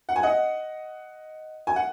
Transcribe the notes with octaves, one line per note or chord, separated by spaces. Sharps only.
F#5
G#5
D#5 F#5
G#5
F#5